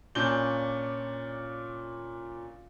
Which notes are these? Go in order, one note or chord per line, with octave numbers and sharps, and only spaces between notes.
A#2 C#4 D4 G6 G7